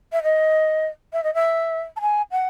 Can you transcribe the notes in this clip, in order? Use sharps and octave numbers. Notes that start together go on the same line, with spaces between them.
E5
D#5
E5
D#5
E5
A5
G#5
F#5